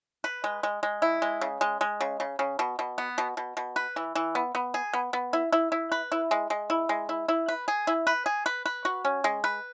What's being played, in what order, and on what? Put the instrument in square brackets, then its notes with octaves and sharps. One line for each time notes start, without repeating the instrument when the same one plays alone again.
[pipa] B4
G#3
G#3
G#3
E4
G#3
C#3
G#3
G#3
C#3
C#3
C#3
B2
B2
B3
B2
B2
B2
B4
E3
E3
B3
B3
G#4
B3
B3
E4
E4
E4
B4
E4
G#3
G#3
E4
G#3
E4
E4
B4
G#4
E4
B4
G#4
B4
B4
F#4
C#4
G#3
B4